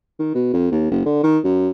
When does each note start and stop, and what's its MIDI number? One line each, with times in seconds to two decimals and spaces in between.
0.19 0.32 51
0.35 0.50 47
0.53 0.71 41
0.71 0.89 39
0.91 1.02 30
1.05 1.21 50
1.23 1.38 51
1.44 1.70 42